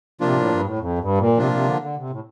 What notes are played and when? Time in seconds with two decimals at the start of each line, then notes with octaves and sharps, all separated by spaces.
0.20 C3 F3 A#3 D4 F4
0.30 A#2
0.35 A2
0.50 G2
0.64 A2
0.79 F2
0.98 G2
1.18 A#2
1.37 C3 F3 A#3 D4 F4
1.48 A#2
1.51 C3
1.66 D3
1.80 D3
1.96 C3
2.10 A2